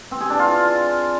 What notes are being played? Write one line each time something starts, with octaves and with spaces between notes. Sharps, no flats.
C4
G#4
D4
F4